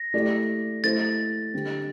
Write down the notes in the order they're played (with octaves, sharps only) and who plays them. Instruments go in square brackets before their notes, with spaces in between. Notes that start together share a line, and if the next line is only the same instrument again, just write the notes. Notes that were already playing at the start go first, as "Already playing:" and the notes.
Already playing: [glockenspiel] A#6
[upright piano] A3 E4 G4 D5
[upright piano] A3 E4 A4 C5 [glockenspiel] A6
[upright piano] D3 G3 C4